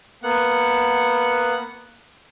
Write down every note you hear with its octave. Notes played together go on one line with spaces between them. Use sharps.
A#3 B3 F#5